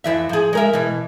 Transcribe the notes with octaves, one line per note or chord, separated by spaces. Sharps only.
F2 E3 E5
F3 G#4
G#3 A#4 E5
B2 E3